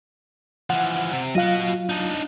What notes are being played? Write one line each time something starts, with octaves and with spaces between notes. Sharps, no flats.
E3 F3 F#5
C3
F#3 F4 F#4 D#5 F5
D4 D#4